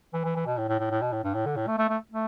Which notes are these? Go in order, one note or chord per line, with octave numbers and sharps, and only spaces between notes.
E3
E3
E3
B2
A2
A2
A2
A2
B2
A2
G2
A2
D3
A2
A3
A3
A3
A3